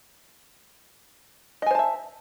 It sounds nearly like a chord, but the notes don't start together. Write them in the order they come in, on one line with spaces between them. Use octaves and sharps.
D#5 G#5 C5 A5 E5